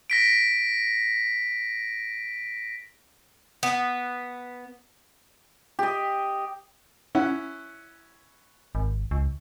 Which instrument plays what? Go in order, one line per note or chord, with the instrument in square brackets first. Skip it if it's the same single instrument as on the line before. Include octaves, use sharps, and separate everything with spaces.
[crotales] A#6 B6 D7
[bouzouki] B3
[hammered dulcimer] G4 D#5
[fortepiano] C#4 E4 F#5
[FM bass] G#1
C#2